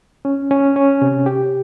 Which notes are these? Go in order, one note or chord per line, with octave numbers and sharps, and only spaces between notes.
C#4
C#4
C#4
C3
G4